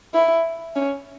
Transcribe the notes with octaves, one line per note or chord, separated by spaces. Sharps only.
E4
C#4